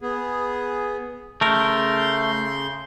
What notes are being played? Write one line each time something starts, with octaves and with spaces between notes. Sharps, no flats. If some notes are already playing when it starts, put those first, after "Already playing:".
B3 G#4
C#3 A3 A#4 C6 G6